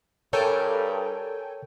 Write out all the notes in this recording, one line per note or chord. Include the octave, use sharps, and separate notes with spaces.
G2 A4 A#4 C#5 G5 G#5